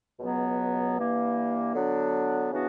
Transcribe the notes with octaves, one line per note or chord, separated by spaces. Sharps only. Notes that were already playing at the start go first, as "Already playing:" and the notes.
C#2 B2 F#3 B3
G2 E3 A#3
D3 F#3 B3 D4
C#3 E3 B3 D4 F#4